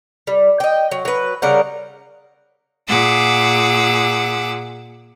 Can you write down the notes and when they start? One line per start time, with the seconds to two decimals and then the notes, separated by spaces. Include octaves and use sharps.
0.27 G3
0.60 D#5 G5
0.91 F#3
1.05 F#3 B4
1.42 C#3 G3 A#4 F#5
2.87 A#2 G#4 F#5 D6 E6